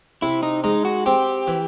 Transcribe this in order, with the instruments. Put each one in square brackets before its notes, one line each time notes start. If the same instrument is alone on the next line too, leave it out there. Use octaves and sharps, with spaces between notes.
[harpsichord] C3 [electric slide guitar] E4
[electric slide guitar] D#4
[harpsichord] G#3 [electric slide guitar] D#4
[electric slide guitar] F#4
[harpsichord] C4 [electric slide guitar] G4
[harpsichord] E3